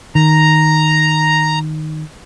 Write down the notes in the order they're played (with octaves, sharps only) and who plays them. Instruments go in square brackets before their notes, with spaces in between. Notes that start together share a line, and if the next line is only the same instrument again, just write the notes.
[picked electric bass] D#3 [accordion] A#5